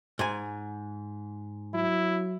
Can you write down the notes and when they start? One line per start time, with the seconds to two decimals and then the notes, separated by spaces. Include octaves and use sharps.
0.19 G#2 G#5
1.74 F#3 E4